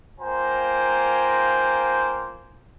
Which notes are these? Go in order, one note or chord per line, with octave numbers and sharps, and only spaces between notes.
A#3 F4 C5 G5 G#5 A#5